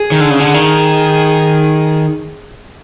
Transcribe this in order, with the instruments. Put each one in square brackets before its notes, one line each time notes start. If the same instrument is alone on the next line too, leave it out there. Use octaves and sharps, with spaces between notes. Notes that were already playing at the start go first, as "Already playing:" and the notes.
Already playing: [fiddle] G#4
[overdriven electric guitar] D#3
D3
C#3
D3
D#3